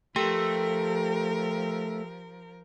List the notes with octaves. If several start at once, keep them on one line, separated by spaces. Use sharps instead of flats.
F3 A3 G4 A#4 G5